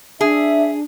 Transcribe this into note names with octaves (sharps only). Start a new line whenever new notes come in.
D4 G#4 E5